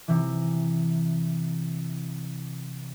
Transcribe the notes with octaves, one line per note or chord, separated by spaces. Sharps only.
C3 E3